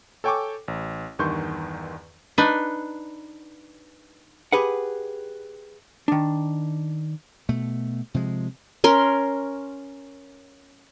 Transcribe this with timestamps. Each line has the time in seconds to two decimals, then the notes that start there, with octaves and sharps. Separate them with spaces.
0.24 A4 C#5 G5 G#5 C#6 D6
0.68 A1
1.19 E2 G2 D#3 C6 C#6 G6
2.38 D4 D#4 B4
4.52 G4 G#4 B4 F#5
6.08 D#3 D4
7.49 B2 A3
8.14 C3 F3 G#3
8.84 C#4 A#4 C6